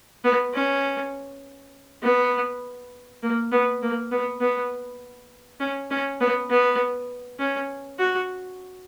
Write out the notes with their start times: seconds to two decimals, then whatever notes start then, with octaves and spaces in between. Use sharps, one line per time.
0.24 B3
0.53 C#4
2.02 B3
3.22 A#3
3.51 B3
3.82 A#3
4.11 B3
4.40 B3
5.60 C#4
5.91 C#4
6.20 B3
6.50 B3
7.39 C#4
7.99 F#4